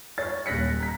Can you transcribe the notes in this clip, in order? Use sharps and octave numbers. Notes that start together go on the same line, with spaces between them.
C#5 A6
D#1 F#6 A#6 B6 C#7
A#5 B6